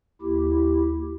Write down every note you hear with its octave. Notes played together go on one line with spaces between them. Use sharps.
D#2 E4 G4